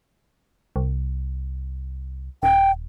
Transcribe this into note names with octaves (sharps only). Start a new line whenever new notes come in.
C2
D#1 G5